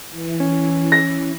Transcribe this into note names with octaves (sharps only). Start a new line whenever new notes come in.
E3
C#4
A#6